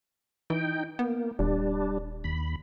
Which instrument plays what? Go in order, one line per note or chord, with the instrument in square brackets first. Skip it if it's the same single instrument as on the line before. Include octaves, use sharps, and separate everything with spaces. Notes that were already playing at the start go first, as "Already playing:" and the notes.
[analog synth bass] E3 [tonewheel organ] D#4 G5
[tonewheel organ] A#3 [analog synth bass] B3
[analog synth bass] D#1 [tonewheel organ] G3 D4
[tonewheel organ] D#2 B5